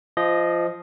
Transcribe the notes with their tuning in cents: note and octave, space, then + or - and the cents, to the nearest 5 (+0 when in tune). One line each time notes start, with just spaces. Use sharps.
F3 -15 D#5 +0